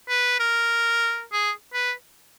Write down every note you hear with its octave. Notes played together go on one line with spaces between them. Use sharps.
B4
A#4
G#4
B4